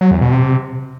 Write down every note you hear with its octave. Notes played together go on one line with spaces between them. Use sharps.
F#3
E2
B2
C3